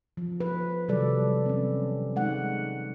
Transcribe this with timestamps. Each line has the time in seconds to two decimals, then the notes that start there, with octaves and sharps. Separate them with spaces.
0.17 F3
0.40 B4
0.88 C3 D#3 F#3 G3 A4 D5
1.46 C4 C#4
2.16 G#3 D#4 F#5